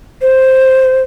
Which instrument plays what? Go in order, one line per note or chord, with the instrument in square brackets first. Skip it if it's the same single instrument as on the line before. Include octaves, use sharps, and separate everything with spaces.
[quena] C5